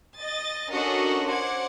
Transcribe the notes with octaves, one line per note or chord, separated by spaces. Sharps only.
D#5 A6
C#4 D4 F#4 A4 A#4 D#5
C5 F#5 D6 G#6